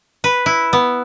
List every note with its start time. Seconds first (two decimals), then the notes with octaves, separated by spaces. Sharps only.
0.24 B4
0.46 E4
0.73 B3